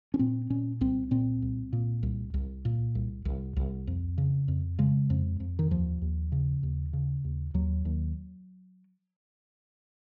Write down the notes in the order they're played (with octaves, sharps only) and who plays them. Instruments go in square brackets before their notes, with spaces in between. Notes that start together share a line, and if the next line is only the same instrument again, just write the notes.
[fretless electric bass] C#4
A#2 C4
A#2 C#4
C2 C4
A#2 C4
C2
A#2
C2
C2
A#2
C2
C2
C2
F2
C#3
F2
C#3 G#3
F2
F2
D#3
D#2 F3
D#2
C#3
D#2
C#3
D#2
D#2 F#3
D#2